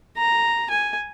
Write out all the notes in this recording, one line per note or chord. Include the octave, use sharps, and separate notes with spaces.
A#5
G#5